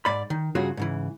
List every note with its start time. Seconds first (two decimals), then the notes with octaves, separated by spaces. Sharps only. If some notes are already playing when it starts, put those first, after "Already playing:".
0.05 G#2 D5 B5
0.30 D#3
0.55 G2 C#3 F#3 F4 F#4 G#4
0.77 G#2 C#3 E3